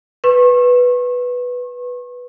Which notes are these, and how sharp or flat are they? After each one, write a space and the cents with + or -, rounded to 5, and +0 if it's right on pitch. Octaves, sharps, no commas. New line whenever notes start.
B4 +0 C#6 -35